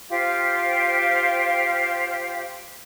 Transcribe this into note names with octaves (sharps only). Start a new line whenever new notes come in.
F4 G4 C5 F5